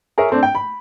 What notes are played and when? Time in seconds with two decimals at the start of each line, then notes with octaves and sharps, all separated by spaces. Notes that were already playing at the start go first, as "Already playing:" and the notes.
0.18 G#4 A#4 C#5 E5
0.30 A3 C4 D4
0.43 G5
0.55 B5